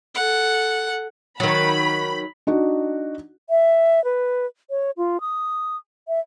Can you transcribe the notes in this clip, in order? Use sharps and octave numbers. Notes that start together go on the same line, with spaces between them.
A4 F#5
D#3 F#3 B5
D4 D#4 F#4
E5
B4
C#5
F4
D#6
E5